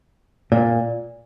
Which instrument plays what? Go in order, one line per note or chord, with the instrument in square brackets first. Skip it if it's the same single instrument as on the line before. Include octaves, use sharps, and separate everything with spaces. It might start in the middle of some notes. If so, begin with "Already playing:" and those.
[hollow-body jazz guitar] A#2